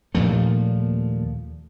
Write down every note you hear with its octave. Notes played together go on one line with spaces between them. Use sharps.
D#2 A#2 F3 A3